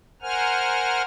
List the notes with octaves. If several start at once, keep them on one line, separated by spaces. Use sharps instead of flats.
A#4 C5 F#5 G#5 F6